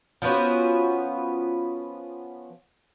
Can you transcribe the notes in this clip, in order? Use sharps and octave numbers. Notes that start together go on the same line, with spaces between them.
F3 B3 C#4 F#4